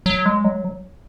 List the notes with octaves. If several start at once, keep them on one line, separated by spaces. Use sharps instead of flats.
F#3
G#3
F#3